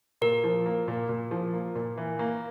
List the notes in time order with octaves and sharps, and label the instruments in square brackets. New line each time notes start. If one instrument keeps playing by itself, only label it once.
[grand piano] A#2 [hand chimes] A#4
[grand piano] F3
A#3
A#2
A#2
F3
A#3
A#2
E3
A#3